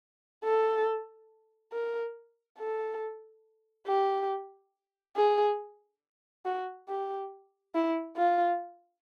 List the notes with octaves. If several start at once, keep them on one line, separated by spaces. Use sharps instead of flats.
A4
A#4
A4
G4
G#4
F#4
G4
E4
F4